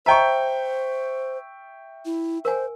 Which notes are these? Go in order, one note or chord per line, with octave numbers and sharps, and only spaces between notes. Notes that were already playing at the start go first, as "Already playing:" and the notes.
C5 D#5 E5 G5 A5 A#5 C#6
E4
A#4 C5 G#5